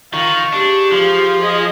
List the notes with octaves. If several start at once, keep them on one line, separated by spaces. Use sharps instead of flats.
D#3 F4 C#6
D4 G4 G#4
F3 F4
G#4 D#5